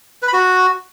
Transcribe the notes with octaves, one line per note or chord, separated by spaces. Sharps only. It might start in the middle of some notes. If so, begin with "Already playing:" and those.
B4
B5
F#4